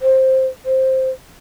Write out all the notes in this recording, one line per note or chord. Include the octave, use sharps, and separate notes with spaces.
C5
C5